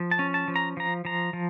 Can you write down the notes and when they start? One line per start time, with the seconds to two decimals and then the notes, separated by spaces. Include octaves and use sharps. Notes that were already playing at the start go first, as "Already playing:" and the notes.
Already playing: F3
0.11 A5
0.19 C#4
0.34 A5
0.48 F3
0.56 A#5
0.77 F3 A#5
1.05 F3 A#5
1.33 F3